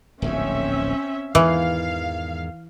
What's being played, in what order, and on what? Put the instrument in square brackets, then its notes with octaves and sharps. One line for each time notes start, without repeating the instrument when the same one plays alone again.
[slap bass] D1 A#1 G#2 [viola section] C4 C#4 E5
[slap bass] E2 G#2 D#3 [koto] E3 [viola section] F5